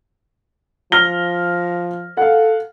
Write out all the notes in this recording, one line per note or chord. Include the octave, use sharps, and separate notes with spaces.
F3 F6 A#6 G7
A4 F5 F#5